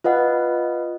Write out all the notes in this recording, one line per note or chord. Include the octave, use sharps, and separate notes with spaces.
F4 B4 D#5 F#5